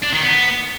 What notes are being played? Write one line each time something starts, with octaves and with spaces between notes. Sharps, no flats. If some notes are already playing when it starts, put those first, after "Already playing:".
D4
D#3
B3